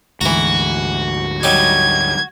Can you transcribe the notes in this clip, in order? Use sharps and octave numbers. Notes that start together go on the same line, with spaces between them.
D2 G#2 E3 F#4 A#5
F#3 G3 D#4 G#6